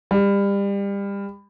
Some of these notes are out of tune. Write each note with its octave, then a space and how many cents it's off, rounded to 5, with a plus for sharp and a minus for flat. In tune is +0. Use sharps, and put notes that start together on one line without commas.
G3 +30